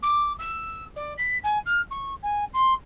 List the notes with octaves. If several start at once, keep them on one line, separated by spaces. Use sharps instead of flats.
D6
E6
D5
B6
G#5
F6
C#6
G#5
C6